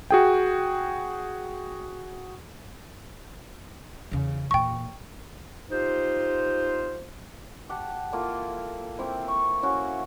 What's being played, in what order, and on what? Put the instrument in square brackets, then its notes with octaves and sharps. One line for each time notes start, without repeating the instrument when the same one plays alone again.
[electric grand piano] F#4 G#4 G5
[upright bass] E2 C#3
[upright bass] E2 A#2 [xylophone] G5 C#6
[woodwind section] D#4 F4 G4 C5
[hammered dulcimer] G4 F#5 A5
A#3 E4 F4 A4
A#3 C4 E4
C#6
C#4 E4 F#4